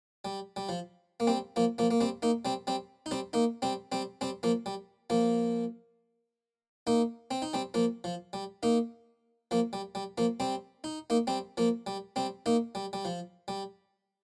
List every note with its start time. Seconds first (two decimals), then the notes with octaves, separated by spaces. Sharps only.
0.25 G3
0.56 G3
0.69 F3
1.20 A#3
1.27 G3 C4
1.56 F3 A#3
1.78 F3 A#3
1.91 A#3
2.01 G3 C4
2.22 A#3 D#4
2.45 G3 C4
2.67 G3 C4
3.06 D#4
3.11 G3 C4
3.33 A#3 D#4
3.62 G3 C4
3.92 G3 C4
4.21 G3 C4
4.43 F3 A#3
4.66 G3
5.10 F3 A#3
6.87 A#3 D#4
7.31 C4
7.42 D#4
7.53 G3 C4
7.74 F3 A#3
8.04 F3
8.33 G3
8.63 A#3 D#4
9.51 F3 A#3
9.73 G3
9.95 G3
10.18 F3 A#3
10.40 G3 C4
10.84 D#4
11.10 A#3 D#4
11.27 G3 C4
11.57 F3 A#3
11.87 G3
12.16 G3 C4
12.46 A#3 D#4
12.75 G3
12.93 G3
13.05 F3
13.48 G3